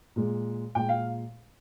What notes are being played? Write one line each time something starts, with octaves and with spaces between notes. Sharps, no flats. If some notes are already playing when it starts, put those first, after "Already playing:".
A#2 G#3
A#2 G#3 G5
F5